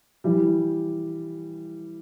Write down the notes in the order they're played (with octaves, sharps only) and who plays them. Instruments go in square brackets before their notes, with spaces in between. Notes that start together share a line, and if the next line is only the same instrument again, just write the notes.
[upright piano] E3 G3